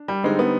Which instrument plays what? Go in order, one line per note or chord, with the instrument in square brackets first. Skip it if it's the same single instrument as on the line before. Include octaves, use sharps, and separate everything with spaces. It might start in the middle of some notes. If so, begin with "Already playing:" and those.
Already playing: [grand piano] D4
[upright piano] G3
[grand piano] D3 G3 C4 D#4 [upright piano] G#3
[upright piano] B3